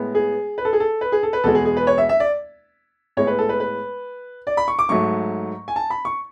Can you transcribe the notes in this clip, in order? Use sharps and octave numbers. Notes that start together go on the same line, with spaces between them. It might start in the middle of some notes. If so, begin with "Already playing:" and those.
Already playing: A2 G#3 B3
G#4
B4
A4
G#4
A4
B4
G#4
A4
B4
E2 B2 G#3 B3 A4
G#4
G#4
B4
C#5
E5
E5
D5
A2 G#3 B3 C#5
B4
A4
B4
B4
D5
B5
C#6
D6
G#2 F#3 A3 C#6
G#5
A5
B5
C#6